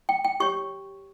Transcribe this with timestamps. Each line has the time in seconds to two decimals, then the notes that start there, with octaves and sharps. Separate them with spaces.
0.09 G5
0.25 G5
0.40 G4 C#5 C#6